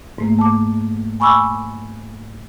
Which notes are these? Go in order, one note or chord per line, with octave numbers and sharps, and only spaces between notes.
G#2 A3 A#3
A5 D6
G#5 B5 C#6 D6 E6